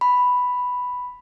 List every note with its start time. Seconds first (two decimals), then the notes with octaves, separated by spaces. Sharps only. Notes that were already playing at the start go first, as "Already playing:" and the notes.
0.01 B5